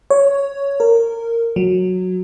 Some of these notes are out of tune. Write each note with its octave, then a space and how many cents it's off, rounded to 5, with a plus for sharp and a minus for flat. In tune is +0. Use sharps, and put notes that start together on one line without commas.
C#5 +5
A#4 -15
F#3 -10